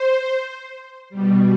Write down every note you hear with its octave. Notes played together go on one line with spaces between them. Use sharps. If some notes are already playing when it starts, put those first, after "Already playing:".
Already playing: C5
B2 G3